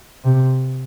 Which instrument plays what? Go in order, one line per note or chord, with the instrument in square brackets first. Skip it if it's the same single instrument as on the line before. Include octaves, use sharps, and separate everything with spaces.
[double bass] C3